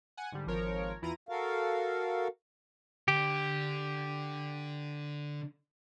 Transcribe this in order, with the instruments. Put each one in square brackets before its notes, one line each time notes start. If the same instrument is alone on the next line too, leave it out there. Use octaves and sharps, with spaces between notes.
[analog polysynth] F#5 G#5
G#2 D3 G3
G#1 F3 A#4 C#5
E2 E4 F4 A#5 D#7
[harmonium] F#4 A4 A#4 F5
[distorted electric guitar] D3 [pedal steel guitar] G4